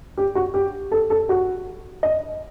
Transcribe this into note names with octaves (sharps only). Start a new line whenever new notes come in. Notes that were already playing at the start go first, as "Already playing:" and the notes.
G4
F#4
G4
A4
A4
F#4
D#5